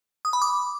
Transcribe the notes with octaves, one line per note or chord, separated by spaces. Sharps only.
D#6
B5
D6